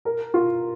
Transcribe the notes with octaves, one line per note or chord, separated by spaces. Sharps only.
A#4
F4